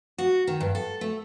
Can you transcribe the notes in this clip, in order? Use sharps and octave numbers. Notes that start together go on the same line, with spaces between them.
F#4
D#3
G2
A4
A3